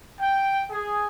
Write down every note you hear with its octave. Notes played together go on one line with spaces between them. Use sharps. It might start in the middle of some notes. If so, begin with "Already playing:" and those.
G5
G#4